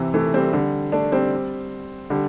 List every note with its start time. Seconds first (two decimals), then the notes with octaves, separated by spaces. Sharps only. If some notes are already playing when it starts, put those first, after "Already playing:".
Already playing: C3 E3
0.14 E3 A3
0.34 G3 C4
0.53 D3 G3
0.92 A3 D4
1.12 G3 C4
2.10 D3 G3